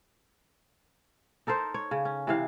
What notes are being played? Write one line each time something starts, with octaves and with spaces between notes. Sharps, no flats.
D#4 A4 A#4 C5
C#5
C#3
C#4
C3 E3 F5